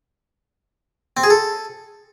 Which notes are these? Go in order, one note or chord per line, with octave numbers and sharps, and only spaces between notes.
C4
G#4
A4